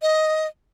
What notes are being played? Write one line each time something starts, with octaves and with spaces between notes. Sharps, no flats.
D#5